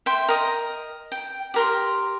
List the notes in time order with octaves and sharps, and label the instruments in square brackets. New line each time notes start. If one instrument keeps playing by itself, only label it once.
[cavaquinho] E5 G5 C6
A#4 D#5
G5
G4 A#4 C6